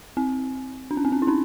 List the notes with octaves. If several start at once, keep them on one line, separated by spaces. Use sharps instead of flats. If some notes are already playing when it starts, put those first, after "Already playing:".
C4
D4
C#4
C4
C#4
E4
C#4 D#4